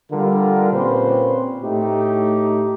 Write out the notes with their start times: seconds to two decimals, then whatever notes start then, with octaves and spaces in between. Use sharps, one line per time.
0.12 D3 G3 F4 A#4
0.72 A#2 C4 C#4 G4 B4 C5
1.63 A2 A3 D#4 G4